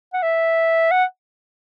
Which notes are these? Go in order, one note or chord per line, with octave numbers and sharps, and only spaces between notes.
F#5
E5
F#5